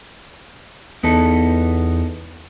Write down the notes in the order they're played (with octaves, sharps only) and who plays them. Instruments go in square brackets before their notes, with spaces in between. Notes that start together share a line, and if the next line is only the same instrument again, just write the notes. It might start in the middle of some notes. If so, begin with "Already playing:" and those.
[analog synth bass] E2 [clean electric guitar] B3 D#4 A4